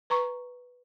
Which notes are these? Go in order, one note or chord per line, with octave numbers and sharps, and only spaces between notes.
B4 A#5 C#6